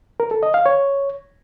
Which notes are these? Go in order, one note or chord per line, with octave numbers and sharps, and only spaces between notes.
A#4
A4
D#5
F5
C#5